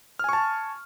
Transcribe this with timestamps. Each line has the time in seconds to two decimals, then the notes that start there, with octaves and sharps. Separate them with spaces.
0.19 F6
0.24 G#5
0.29 C#6
0.33 A5